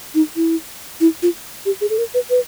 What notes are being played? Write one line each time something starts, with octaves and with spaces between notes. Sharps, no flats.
D#4
E4
E4
F4
G4
G#4
A4
A#4
B4
B4